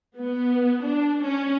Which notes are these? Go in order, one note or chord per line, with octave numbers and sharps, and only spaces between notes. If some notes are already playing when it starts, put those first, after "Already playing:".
B3
D4
C#4